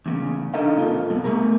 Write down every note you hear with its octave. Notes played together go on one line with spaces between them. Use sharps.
E2 A#2 C#3
D4 D#4 A4 A#4 D#5 F5
A#2 C4 F4 A4
C2 F#2 B2
A3 B3 G#4 A#4